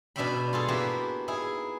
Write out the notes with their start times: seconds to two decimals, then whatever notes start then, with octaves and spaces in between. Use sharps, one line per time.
0.16 B2 D4 F#4 E5 G5 B5
0.53 F4 G#4 A4
0.68 A#3 B3 E4 F#4 G4
1.28 D#4 E4 G#4